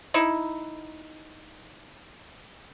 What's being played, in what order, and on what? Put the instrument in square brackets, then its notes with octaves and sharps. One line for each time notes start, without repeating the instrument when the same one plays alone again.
[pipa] D#4 E4